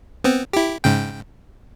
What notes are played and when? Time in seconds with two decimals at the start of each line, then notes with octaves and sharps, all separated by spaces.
0.24 B3 C4
0.53 E4 G4
0.84 G#2 C#3 G5